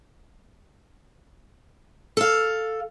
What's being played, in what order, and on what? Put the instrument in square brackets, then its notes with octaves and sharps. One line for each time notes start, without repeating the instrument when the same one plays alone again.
[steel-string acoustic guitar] A4 F5